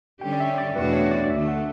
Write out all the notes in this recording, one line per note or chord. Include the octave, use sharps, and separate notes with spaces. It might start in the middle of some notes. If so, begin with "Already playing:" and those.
D3 G3 C#4 G4 G5
D5
E5
D5
E2 B2 A3 D4 F#4 B4
C#5
D5
D5
D2 D3 A3 E5
F#5